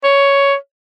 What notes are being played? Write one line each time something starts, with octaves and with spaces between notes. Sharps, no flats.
C#5